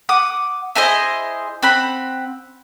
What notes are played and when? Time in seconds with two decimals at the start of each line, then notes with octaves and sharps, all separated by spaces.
0.09 F#5 D6 D#6
0.75 E4 G#4 C5 D#5
1.63 C4 F#5 B5